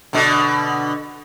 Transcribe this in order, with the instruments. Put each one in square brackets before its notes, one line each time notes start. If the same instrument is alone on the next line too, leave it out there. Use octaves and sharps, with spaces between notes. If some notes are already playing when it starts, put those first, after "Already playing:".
[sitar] B2 D3